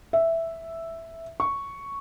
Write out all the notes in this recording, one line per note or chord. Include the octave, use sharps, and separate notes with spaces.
E5
C#6